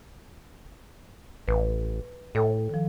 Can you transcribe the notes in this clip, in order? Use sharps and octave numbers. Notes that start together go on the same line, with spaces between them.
A1 B4
A2 A4 C#5 G5
D#3 F3